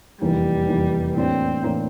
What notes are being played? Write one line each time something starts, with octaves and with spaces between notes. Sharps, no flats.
F1 E2 E3 G3 A#3
F1 E2 E3 A#3
A2 E3 A#3 C4 D4
A2 E3 A#3 D4